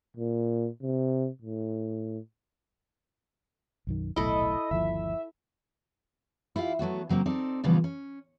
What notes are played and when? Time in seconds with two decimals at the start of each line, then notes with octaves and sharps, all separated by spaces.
0.17 A#2
0.82 C3
1.42 A2
3.87 B1 F#2 D#3
4.16 D#1 B1 A2 E4 A4 D#5
4.71 G1 D#2 F3 E5
6.56 E4 F4 G4 F5
6.79 F#3 A3 B3 F#4
7.09 C#3 F#3 A#3 C4
7.26 C4 D#4 A4 D5
7.64 A#2 C#3 E3 F3 G3 B3
7.84 C#4